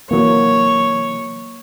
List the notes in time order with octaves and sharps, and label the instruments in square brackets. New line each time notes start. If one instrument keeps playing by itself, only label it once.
[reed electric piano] C3 E3 F#3 [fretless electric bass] A#3 [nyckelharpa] C#5